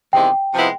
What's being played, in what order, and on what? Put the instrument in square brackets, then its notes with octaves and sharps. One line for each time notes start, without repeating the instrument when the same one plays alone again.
[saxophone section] E2 C3 D#3 G#3 [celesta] G5
[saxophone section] C3 F3 G#3 B3 E4